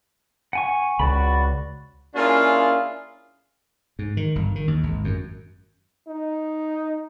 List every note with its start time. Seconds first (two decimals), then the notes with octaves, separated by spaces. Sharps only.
0.53 F#5 G#5 C#6
0.99 C#2 F#4 D5 B5
2.15 A#3 C#4 D4 E4 F4 G#4
3.99 G#2
4.17 D#3
4.36 G1
4.55 D#3
4.68 D#2
4.83 G#1
5.04 F#2
6.08 D#4